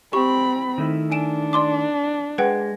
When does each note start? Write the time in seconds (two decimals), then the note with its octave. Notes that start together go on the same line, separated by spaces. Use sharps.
0.13 C4 G4 B5 C#6
0.78 D#3 A3 E4
1.12 D4 G#5 D7 E7
1.53 D5 C6 D6
2.38 G#3 B4 F#5 G5